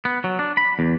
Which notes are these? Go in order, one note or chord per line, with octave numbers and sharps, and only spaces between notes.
B3
F#3
D4
B5
E2